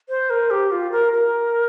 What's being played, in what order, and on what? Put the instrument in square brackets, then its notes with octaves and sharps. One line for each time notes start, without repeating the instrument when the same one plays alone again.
[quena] C5
A#4
G4
F4
A#4
A#4